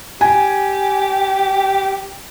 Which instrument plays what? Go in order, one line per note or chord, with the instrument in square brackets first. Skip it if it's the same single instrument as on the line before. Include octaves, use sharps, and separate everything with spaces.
[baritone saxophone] G4 [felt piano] G#5